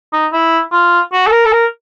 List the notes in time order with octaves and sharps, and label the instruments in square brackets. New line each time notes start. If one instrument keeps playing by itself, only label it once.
[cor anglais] D#4
E4
F4
F#4
A4
A#4
A4
A#4